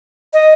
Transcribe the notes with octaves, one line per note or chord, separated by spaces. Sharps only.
D#5